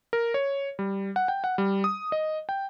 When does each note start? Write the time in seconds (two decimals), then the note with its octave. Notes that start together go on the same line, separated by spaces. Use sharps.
0.13 A#4
0.34 C#5
0.79 G3
1.16 F#5
1.28 G5
1.44 F#5
1.58 G3
1.84 D#6
2.12 D#5
2.49 G5